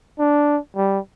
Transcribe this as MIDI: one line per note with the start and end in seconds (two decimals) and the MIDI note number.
0.19 0.58 62
0.76 0.99 55